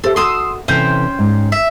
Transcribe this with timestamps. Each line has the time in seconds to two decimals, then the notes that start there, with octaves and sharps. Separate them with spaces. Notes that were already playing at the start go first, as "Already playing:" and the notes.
0.04 G4 A4 C5 E5
0.16 F#4 A4 C6 D#6 E6
0.68 C3 E3 C#4 A4 C5 G5
1.19 G#2
1.52 E5